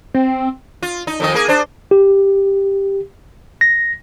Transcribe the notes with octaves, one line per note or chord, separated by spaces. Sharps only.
C4
F4
D#4
F2 D#3 D#5
A#3 G#4 A#4
D4 C5
G4
A#6